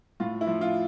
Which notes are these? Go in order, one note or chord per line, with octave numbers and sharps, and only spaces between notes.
A2 F4
E4
F3
F4